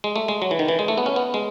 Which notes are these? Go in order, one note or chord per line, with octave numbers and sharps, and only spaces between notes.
G#3
A3
G#3
F#3
E3
D#3
E3
G#3
A3
B3
C#4
B3
G#3